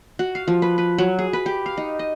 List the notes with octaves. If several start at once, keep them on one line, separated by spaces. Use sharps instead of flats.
F#4
F5
F3
B4
B4
F#3
G#4
B4
G4
F5
D#4
D#5